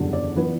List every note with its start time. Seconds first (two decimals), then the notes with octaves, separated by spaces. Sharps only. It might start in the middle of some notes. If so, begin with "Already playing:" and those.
Already playing: F#1 E2 D3 G3
0.13 D5
0.36 E3 B3 B4